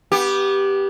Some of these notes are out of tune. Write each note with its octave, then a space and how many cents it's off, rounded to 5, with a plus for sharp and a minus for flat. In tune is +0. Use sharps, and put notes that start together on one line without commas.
B3 -20 G4 +0